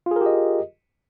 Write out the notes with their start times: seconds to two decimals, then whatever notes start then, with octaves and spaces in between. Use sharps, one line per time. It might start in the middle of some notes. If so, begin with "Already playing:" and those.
0.06 F4
0.11 G#4
0.16 A#4
0.21 G4
0.26 D#5